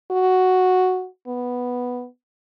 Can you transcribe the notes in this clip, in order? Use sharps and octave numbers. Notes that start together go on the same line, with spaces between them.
F#4
B3